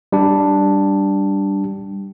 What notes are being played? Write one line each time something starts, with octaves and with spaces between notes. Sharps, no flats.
G3 D4